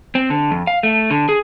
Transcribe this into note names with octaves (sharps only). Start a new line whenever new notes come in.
C4
D3
F2
F5
A3
D3
G#4